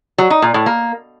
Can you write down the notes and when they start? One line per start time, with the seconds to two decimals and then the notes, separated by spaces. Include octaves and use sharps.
0.18 F#3
0.30 D#4
0.42 A#2
0.54 A2
0.66 A#3